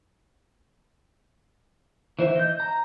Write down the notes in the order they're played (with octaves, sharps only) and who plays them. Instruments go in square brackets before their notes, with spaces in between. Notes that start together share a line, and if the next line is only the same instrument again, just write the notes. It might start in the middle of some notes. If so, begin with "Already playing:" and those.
[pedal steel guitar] E3 C5 E5
D#5 G6
A#5